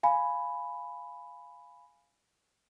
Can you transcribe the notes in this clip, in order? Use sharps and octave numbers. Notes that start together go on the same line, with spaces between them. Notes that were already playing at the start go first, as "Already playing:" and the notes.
F5 G#5 B5